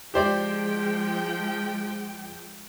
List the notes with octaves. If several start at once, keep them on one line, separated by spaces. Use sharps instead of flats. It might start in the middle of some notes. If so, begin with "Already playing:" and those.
F3 G#3 G4 C5 D5 G5